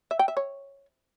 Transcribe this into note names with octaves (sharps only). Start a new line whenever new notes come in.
E5
G5
E5
C#5